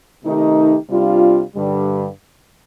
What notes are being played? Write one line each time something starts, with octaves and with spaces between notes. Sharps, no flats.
C3 D#3 A3 D#4 G4
C3 G3 D4 F4
G2 D3 G3